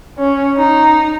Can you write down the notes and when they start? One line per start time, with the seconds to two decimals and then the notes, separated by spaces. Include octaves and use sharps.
0.18 C#4
0.57 D#4